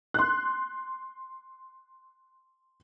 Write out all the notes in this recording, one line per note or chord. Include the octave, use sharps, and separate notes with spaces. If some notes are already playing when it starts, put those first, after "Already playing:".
C6 F#6